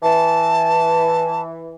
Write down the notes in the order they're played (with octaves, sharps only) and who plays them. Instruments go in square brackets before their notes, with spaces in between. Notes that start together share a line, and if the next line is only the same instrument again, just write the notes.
[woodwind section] E3 [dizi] A5